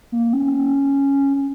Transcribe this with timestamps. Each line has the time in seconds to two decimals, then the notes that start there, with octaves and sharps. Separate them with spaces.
0.12 A#3
0.33 C#4